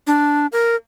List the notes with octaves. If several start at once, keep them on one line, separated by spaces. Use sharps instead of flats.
D4
A#4